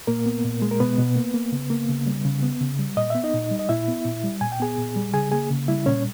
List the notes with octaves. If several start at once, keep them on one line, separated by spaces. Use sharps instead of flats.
A#2 A#3 A#4
B3
A#2
G#3
A#4
B2 B3 B4
B2
A#3
A#3
C#3
A#3
C#3
G3
C#3
B3
C#3
G3
A#2 D#5
B3 E5
D#4 D#5
A#2
G3
D#5
A#2 E4 E5
B3
A#2
G3
A#2 G#5
G5
B3 G#4 G#5
A#2
G3
C#3 G#4 G#5
A#3 G#4 G#5
C#3
G3 E4 E5
A#2 C#4 C#5